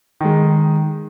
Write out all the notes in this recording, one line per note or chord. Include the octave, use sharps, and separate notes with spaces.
D#3 G#3